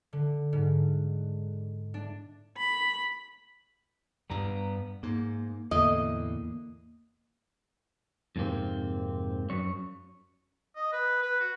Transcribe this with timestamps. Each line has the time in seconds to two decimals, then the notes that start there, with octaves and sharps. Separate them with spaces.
0.13 D3
0.53 G#2
1.94 D4
2.57 B5
4.30 G2 G3 B3 A#5
5.03 G#2 A#3
5.71 E2 A2 D3 A#3 D#5
8.36 F2 G#2 C3 A#3 C4
9.50 F#2 C#5
10.76 D#5
10.92 B4
11.23 B4
11.40 F#4